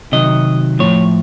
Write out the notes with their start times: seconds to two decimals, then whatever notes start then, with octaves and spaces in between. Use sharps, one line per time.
0.12 C3 D#3 F#3 D#5
0.79 A2 F3 C#5